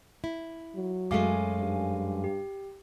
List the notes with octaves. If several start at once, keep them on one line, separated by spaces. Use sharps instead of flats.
E4
F#3
F#2 G#3 A3 F5 G#5 D6
G2
G4